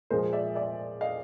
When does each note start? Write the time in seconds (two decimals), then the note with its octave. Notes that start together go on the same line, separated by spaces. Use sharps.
0.10 A#2 F3 G#3 A#4 C5
0.33 D5 E5
0.55 D5 E5
1.01 D#5 F5